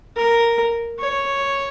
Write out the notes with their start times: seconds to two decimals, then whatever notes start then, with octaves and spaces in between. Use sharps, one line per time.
0.16 A#4
0.99 C#5